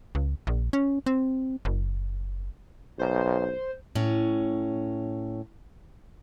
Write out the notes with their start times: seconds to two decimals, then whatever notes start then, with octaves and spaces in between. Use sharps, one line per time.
0.15 C#2
0.47 A#1
0.73 C#4
1.06 C4
1.65 F#1
2.99 B1 C5
3.95 A2 C#4